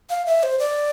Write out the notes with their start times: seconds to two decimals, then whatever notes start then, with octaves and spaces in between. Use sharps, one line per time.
0.10 F5
0.26 E5
0.43 C5
0.59 D5